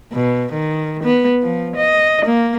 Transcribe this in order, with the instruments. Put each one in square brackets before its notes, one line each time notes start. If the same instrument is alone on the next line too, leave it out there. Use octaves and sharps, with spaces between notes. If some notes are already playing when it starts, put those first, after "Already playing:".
[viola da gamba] B2
D#3
B3
F3
D#5
A#3